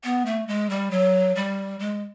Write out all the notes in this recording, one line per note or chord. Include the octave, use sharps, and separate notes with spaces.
B3
A3
G#3
G3
F#3
G3
G#3